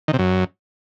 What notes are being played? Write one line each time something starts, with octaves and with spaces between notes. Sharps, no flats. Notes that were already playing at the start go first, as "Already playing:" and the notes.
D#3
C3
F#2